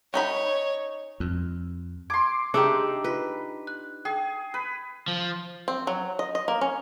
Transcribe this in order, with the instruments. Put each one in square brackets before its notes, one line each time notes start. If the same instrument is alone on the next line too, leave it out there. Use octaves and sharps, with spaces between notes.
[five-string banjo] C#4 D#4 B5 [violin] C#5
[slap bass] F2
[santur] C6 D6 [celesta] G#6
[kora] D4 D#4 G4 [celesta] G#4 E5 E6
[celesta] F4 [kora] B4
[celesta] F#6
[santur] G#4 [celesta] G5
[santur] B4
[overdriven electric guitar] F3
[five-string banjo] C4
F#3
D#5
D#5
A#3
C#4